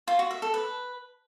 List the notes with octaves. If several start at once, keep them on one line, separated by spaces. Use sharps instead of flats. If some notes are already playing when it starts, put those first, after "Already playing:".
F4
F#4
E5
A4
B4